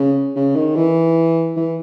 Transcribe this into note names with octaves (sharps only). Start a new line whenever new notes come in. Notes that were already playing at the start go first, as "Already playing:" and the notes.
Already playing: C#3
C#3
D#3
E3
E3